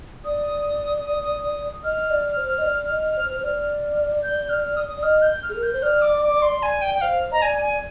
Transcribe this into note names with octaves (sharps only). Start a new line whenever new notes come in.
D5 D#6
D#5 F6
D5
C5
D#5
D5
D#5
C5
C5
D5
G6
F6
D#6
D5
D#5 F6
G6
F6
G#4
A#4
G6
C5
D5 F6
D6
D6
C6
D5 G#5
G5
G5
C5 F5
D#5 A#5
D5 G#5
G#5